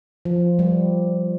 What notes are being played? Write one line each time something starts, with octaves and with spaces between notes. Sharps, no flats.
F3
G3